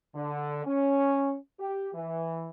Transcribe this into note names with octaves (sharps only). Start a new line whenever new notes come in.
D3
C#4
G4
E3